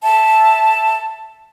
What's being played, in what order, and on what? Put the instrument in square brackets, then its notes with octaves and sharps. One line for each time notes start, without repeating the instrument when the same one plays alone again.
[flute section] E5 A5